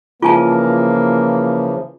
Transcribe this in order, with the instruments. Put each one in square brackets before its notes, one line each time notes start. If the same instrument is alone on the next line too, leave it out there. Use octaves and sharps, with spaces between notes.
[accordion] C#3 E3 F3 [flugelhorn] A#3 [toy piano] F4 G#5 A5